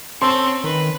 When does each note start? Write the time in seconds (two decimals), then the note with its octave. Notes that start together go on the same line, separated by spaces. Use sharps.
0.22 C4 C#4 A4 C5 C6
0.64 D#3 B4